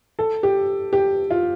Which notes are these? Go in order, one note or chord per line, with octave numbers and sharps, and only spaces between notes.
A4
G4
G4
F4